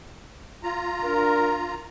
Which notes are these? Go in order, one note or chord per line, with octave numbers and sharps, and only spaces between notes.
F4 A#5
D4 A#4